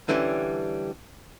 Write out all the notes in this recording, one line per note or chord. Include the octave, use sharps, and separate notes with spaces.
D3 E3 G3 C#4